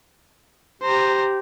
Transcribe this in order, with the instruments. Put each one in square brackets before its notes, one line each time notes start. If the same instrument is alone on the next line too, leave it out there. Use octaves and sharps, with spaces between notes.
[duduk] G4 [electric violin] C5 A#5